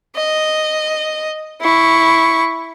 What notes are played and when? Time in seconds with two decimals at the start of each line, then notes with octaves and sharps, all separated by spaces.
0.16 D#5
1.61 E4 C#6